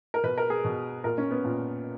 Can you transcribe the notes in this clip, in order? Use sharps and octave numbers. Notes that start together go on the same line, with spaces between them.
A#4
B2 B4
A#4
G#4
B2
A#2 A#4
C#4
B3
A#2